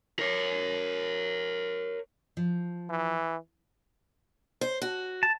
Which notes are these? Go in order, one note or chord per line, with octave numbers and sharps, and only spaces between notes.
A#4 C#5
F3
E3
C5
F#4
A5